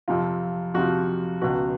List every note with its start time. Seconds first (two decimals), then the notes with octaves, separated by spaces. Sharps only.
0.08 F2 C3 F3 F4
0.74 F2 C3 F3 F#4
1.42 C#2 B2 F#4